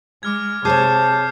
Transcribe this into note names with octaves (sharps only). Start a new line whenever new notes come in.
G#3 D6 F6 G#6
C3 G#4 C5 C#5 A5 D6 G6 C7